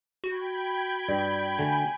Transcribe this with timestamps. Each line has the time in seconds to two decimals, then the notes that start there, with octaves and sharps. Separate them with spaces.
0.24 F#4 G5 B5 G#6
1.09 G2 D5
1.59 D3 A3 G#5